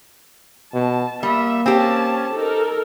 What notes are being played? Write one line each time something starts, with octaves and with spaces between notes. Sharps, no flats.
B2 A5
G3 A#3 E5
C4 C#4 G4 A5
D#4 A4 A#4